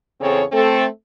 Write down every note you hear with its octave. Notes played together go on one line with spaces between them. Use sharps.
E2 C#3 C4 G#4 A4 C#5
A3 C4 A4